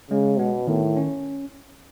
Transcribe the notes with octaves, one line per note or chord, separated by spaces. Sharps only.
C#3 G#3
B2 B3
A2 D#3
C#4